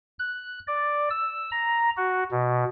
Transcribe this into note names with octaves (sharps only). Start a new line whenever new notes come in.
F#6
D5
E6
A#5
F#4
B2